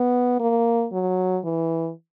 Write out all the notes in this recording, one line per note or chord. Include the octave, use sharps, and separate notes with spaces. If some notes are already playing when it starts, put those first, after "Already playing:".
Already playing: B3
A#3
F#3
E3